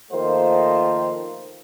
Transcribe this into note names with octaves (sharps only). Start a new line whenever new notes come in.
D#3 F3 A3 A#3 F4 C5